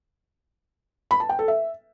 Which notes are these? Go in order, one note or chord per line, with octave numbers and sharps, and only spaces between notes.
B5
A5
G5
A4
E5